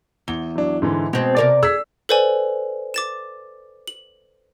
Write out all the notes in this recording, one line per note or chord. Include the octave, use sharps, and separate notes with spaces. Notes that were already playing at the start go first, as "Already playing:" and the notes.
E2 G7
F#3 D4
G#2 D3 E3
B2 G#3 C4
C3 A#4 D5
G#4 E6 B6
A4 B4 C5 D5 G#5
D6 A6 E7
F#7